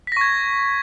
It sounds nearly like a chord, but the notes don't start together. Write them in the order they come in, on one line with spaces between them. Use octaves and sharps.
B6 A#6 C#6 G#6